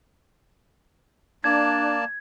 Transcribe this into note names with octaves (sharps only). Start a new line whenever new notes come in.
A#3 D4 D5 A5 G#6